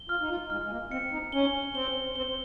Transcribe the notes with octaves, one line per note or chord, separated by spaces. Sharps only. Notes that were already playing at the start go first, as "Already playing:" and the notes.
Already playing: G7
F4 F6
D#4
F4
G#3 F6
G#3
A#3
C4 C#7
D#4
C#4 G7
C4 G7
C4 G7